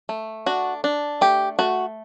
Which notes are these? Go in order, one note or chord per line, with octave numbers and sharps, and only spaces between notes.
A3
D4 F#4
D4
A3 G4
A3 F#4